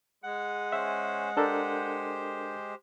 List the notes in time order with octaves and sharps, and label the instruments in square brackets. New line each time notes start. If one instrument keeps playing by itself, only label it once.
[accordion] G#3 [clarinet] F#5
[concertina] C#4 C5 [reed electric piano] E5
[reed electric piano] D4 A4 A#4 [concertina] G4 C5